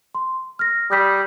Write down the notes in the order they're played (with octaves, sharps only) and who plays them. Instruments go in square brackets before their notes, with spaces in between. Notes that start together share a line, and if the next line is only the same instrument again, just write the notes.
[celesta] C6
F6 A#6
[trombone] G3 [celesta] D#6 G6 B6